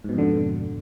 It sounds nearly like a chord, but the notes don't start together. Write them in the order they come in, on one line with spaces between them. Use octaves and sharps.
G#2 B2 F2 D3